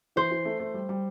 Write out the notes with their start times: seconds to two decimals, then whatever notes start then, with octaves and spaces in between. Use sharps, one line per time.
0.16 E3 C5
0.31 E3
0.45 A3
0.60 A3
0.74 G3
0.89 G3